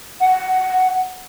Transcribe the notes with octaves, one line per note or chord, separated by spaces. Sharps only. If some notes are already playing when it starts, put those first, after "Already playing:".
F#5